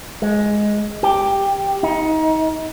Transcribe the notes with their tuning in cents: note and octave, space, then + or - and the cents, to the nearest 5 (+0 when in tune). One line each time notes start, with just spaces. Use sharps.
G#3 +5
G4 +5
D#4 +25